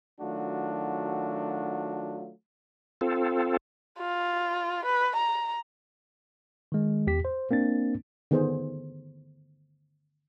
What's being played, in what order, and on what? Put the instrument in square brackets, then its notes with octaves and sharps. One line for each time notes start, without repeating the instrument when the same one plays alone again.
[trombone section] D#3 F#3 A3 D4 F4 F#4
[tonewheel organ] C4 F4 A4
[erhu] F4
B4
A#5
[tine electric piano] D#3 G#3
E2 G4 B6
C5
A#3 C4 D4 A6
[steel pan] D3 D#3 B3 G#4 C5